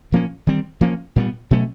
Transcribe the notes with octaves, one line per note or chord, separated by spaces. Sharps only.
A#2 F3 A#3 C#4
D#3 G3 C4
F3 A#3 C#4
A#2 G3 B3
B2 F#3 A3 C#4